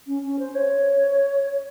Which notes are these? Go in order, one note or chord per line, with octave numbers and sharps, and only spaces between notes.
C#4
C#4
C5
C#5